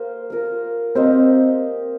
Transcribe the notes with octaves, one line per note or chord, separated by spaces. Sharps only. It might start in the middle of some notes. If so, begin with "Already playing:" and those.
Already playing: A#3 G4 C5
A#3 F4 A#4
A#3 C4 G4 C5 D#5